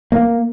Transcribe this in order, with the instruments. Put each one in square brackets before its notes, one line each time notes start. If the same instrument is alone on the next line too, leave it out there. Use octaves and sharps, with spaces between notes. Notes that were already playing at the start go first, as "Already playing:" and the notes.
[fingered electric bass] A#3